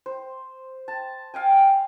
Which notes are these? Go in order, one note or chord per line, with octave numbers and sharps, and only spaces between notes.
C5
A5
F5 G5 G#5